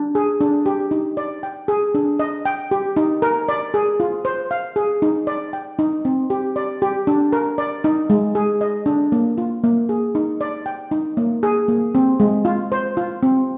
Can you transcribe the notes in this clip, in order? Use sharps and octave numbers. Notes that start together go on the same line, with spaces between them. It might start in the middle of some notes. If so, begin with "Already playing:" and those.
Already playing: D4
G#4
D4
G4
D#4
D5
G5
G#4
D4
D#5
G5
G4
D#4
A#4
D5
G#4
F4
C5
F5
G#4
D#4
D5
G5
D#4
C4
G4
D5
G4
D4
A#4
D5
D#4
G#3
G#4
D#5
D4
A#3
F4
A#3
G#4
D#4
D5
G5
D#4
A#3
G#4
A#3
C4
G#3
F4
C5
F4
C4